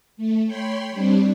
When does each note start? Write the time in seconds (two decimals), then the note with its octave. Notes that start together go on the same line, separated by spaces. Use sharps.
0.17 A3
0.46 C#5 G5 B5 C6
0.91 G3 C4 D4